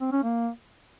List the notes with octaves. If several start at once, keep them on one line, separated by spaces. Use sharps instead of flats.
C4
C#4
A#3